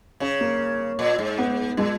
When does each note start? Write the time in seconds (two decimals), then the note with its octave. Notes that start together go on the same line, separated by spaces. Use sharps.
0.20 C#3 C#4
0.41 A#3
0.99 A#2
1.18 G#2
1.38 B3
1.77 A#2 G#3